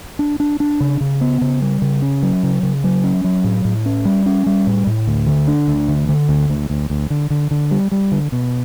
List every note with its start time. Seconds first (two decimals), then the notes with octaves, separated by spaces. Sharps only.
0.19 D4
0.40 D4
0.60 D4
0.80 C#3
1.01 C#3
1.21 B3
1.41 C#3
1.61 G3
1.82 C#3
2.02 C#4
2.23 F#3
2.43 C#3
2.63 C#3
2.84 F#3
3.04 C#4
3.24 F#3
3.44 A2
3.65 A2
3.85 C#4
4.05 G3
4.26 C#4
4.46 G3
4.67 A2
4.87 A2
5.07 D2
5.27 D3
5.48 D4
5.68 D2
5.89 D3
6.09 D3
6.29 D2
6.50 D2
6.70 D2
6.90 D2
7.10 D3
7.30 D3
7.51 D3
7.71 G3
7.92 G3
8.12 D3
8.32 B2